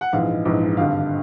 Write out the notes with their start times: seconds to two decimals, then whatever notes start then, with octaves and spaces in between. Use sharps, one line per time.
0.01 F#5
0.13 A#1 G#2 E3 G#3 F5
0.45 A#1 G#2 E3 G#3
0.77 G#1 G2 D3 F5